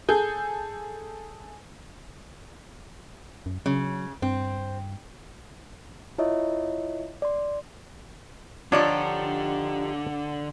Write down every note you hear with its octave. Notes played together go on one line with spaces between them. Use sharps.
G#4 A4 G6
F#2
C#3 F#3
G2 C4
E4 F4 C#5 D#5 E5
D5 C6
D3 F3 D4 D#4 F4 G4 C#5 D5